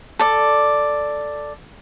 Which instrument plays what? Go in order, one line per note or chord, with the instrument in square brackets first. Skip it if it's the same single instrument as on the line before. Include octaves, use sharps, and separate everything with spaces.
[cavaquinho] A4 D5